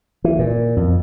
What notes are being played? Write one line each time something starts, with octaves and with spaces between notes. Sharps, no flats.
E3
A#2
F2